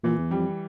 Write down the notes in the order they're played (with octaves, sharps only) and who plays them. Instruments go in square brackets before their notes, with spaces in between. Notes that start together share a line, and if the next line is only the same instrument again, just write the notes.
[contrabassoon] A#2 [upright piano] E3
[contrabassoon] E2
[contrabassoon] F2 [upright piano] G3